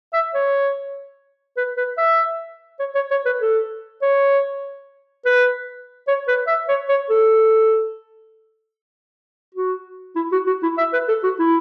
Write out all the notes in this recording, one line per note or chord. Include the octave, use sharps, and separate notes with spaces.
E5
C#5
B4
B4
E5
C#5
C#5
C#5
B4
A4
C#5
B4
C#5
B4
E5
C#5
C#5
A4
F#4
E4
F#4
F#4
E4
E5
B4
A4
F#4
E4